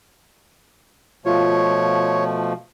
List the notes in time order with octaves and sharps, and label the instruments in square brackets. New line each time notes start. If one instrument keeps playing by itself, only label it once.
[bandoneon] B2 F3 A3 [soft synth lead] F4 [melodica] C#5